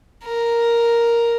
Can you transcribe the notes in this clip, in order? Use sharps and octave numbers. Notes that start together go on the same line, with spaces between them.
A#4